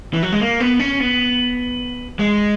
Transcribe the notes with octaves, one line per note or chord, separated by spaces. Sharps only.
E3
F#3
G#3
A#3
B3
C#4
B3
G#3